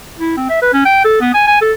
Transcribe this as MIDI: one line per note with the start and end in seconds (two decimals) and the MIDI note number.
0.19 0.33 64
0.37 0.47 60
0.49 0.57 76
0.62 0.73 71
0.73 0.84 61
0.85 1.00 79
1.04 1.18 69
1.21 1.30 59
1.34 1.42 80
1.47 1.59 80
1.61 1.72 69